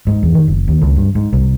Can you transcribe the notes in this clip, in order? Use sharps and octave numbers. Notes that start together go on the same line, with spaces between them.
G#2
E2
D#3
F#1
D#2
C#2
G2
G#2
C2